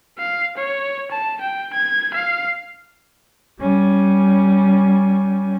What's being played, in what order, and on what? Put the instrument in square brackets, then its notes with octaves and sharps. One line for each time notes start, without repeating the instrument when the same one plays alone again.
[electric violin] F5
C#5
A5
G5
G#6
F5
[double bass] G3 C#4